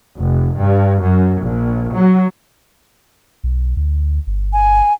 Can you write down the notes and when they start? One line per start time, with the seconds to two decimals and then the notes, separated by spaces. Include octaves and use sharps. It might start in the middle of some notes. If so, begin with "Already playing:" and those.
0.17 F1
0.57 G2
1.01 F#2
1.41 A#1
1.92 F#3
3.44 B1
3.77 D2
4.27 G1
4.53 G#5